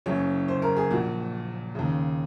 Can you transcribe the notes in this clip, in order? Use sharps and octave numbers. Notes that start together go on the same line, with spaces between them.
F#1 F#2 C#3 C#5
C5
A#4
G#4
A#1 A#2 F#4
D#2 C#3